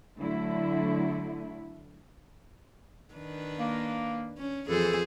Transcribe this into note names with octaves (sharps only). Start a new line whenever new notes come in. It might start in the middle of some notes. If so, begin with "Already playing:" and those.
D3 F#3 A3 E4
D#3 D4 B4
A#3
C#4
F2 E3 G#4 A4 C5